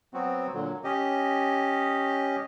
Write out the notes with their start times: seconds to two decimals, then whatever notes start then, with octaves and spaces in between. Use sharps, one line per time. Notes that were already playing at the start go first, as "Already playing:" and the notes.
0.14 F#3 B3 C4 F#4
0.53 A#2 D3 F#3
0.84 C#4 G4 D#5